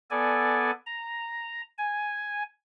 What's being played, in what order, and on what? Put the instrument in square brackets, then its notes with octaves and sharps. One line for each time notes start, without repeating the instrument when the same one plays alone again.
[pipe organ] B3 A4 D5 G#5
A#5
G#5